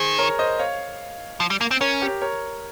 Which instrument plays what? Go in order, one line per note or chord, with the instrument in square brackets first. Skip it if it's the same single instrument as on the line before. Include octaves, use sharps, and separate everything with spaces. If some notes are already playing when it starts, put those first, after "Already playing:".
Already playing: [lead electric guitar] D#3 [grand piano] G#4 C5
[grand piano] A#4 C#5
C5 D#5
C#5 F5
[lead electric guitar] F3
G3
A#3
C4
[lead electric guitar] C#4 [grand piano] A#4 C#5
[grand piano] G4 A#4
A#4 C#5